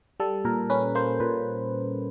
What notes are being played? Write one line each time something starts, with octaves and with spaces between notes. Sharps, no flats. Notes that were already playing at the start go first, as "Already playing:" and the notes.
G3 A4
A#2 A#4
C#4 B4
A#3 C5
A#2 B4